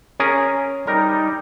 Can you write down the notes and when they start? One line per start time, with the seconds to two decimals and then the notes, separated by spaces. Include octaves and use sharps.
0.20 C#4 G#4 A#4
0.87 G3 D#4 A#4